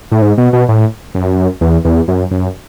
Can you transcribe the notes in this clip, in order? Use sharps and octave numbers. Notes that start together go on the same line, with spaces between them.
A2
G#2
B2
B2
A2
F#2
E2
E2
F#2
F#2